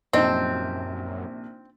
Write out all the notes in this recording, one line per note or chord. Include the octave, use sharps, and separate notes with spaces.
A#1 F#2 C3 C4 D#4 D#5 A5